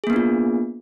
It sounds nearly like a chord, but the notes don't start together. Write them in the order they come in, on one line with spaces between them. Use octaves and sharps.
G#4 A#3 B3 D4 F4